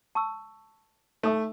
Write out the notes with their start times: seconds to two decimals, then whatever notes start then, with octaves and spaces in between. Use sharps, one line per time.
0.15 A5 C#6 E6
1.23 A3 D#4 A4 E5